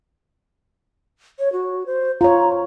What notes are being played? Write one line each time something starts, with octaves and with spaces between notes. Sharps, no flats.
C#5
F#4
C5
F4 C#5 A#5